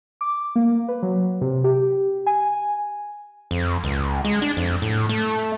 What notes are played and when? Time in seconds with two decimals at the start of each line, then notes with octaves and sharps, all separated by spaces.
0.21 D6
0.56 A#3
0.88 B4
1.02 F#3
1.41 C3
1.64 G4
2.26 G#5
3.51 F2
3.84 C#2
4.24 G#3
4.42 D4
4.57 F2
4.82 A2
5.09 A3